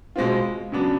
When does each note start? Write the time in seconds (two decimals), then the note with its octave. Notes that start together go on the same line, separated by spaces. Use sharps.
0.16 B2 G#3 C4 F4
0.72 C#3 F#3 B3 D4